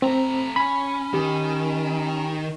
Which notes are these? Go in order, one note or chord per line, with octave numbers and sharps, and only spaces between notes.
A3 C4 A#5
C#4 B5
D#3 G4